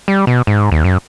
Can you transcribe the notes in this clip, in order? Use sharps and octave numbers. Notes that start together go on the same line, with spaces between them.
G3
B2
G#2
D#2
F#2